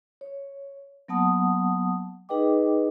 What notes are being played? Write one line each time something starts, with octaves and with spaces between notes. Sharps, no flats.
C#5
F#3 A#3 B3 F#5 A5 D#6
D#4 G#4 B4 D#5 G5 D6